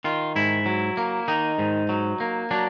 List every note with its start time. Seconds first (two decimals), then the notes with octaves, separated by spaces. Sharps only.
0.04 D#3 F4
0.36 G#2 E4
0.66 F#3
0.97 A#3
1.28 D#3 D#4
1.59 G#2
1.89 F#3
2.20 A#3
2.51 F#3 D4